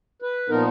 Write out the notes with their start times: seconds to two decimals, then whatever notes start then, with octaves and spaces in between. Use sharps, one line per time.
0.22 B4
0.49 A#2 F3 B3 D#4 A#4